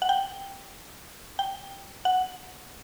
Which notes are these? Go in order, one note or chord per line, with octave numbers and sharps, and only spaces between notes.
F#5
G5
G5
F#5